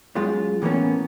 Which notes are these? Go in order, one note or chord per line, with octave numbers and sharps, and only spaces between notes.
F#2 G#3 F4
A2 E3 A#3 B3 C#4